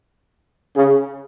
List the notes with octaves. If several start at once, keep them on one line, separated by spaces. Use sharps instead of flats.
C#3